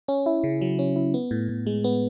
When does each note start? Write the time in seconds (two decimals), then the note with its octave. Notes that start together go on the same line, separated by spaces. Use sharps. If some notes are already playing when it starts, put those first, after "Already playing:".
0.08 C#4
0.26 E4
0.44 C#3
0.61 F#3
0.79 C#4
0.96 E4
1.14 B3
1.31 A2
1.49 A2
1.66 G#3
1.84 B3